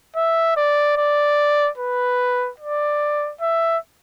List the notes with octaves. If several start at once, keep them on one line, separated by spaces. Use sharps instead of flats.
E5
D5
D5
B4
D5
E5